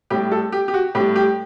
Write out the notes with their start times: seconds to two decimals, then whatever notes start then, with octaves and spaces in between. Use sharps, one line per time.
0.10 A2 G3 G4
0.31 A4
0.52 G4
0.68 G4
0.74 F#4
0.95 A2 G4
1.00 G3
1.16 G4